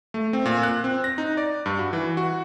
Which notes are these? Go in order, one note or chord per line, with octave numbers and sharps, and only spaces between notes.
A3
C4
A#2
F#6
C4
A#6
D#4
D5
G2
F#4
E3
F#4